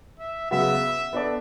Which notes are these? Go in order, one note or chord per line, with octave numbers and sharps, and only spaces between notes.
E5
C#3 F#3 B3 F#4 E5
B3 D4 A4 D5